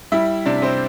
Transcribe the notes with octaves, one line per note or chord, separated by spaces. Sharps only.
G3 E4 E5
C3 D4 D5
C4 C5